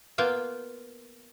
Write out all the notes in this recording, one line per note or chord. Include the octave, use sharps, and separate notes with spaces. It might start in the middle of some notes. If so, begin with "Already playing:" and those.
A#3 B3 F4 G5